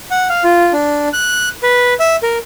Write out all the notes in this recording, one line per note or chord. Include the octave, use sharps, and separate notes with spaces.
F#5
F5
F4
D4
F#6
B4
E5
A#4